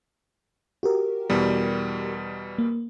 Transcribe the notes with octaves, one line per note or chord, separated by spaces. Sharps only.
F#4 G4 A#4
E2 B2 G3
A#3